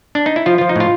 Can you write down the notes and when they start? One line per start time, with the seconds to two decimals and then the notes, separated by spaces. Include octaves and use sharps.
0.15 D4
0.26 D#4
0.36 E4
0.46 F3 F4
0.58 F3 F4
0.69 D#4
0.76 A2 F4